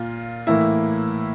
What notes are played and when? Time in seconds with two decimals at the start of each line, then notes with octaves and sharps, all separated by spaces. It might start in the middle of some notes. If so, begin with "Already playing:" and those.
Already playing: A#2 F4
0.47 A2 E3 A#3 E4